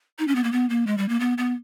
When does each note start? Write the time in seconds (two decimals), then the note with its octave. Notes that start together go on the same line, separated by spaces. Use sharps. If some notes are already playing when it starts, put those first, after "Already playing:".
0.19 D#4
0.28 C#4
0.35 B3
0.44 A#3
0.52 B3
0.70 A#3
0.87 G#3
0.98 G3
1.09 A#3
1.20 B3
1.38 B3